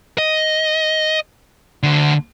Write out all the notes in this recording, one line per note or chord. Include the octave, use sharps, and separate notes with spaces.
D#5
D2 D3